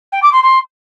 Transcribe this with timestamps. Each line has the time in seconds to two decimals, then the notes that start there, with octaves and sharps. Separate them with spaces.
0.12 G5
0.22 D6
0.32 C6
0.42 C6